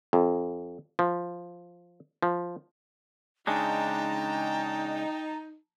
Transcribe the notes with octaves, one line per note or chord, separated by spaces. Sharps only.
F2
F3
F3
C#3 G#3 D4 D#4 G5 A5 A#5